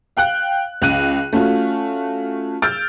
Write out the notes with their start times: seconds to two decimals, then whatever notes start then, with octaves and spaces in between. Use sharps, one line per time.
0.17 F5 G5 F#6
0.82 C#2 F#6 D#7
1.33 A3 C#4 F4 F#4
2.62 E6 F6 G6 A6 D7